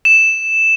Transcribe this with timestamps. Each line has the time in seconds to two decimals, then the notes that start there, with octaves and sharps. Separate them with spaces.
0.05 E7